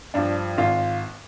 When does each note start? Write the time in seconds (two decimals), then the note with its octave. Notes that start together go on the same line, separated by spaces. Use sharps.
0.14 G2 F3 D4
0.58 G#1 F4